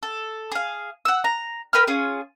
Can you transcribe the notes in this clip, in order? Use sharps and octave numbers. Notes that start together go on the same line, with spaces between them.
A4
G#4 F5
F#5 E6
A#5
A#4 B4 G5 F6
C#4 F4 G#4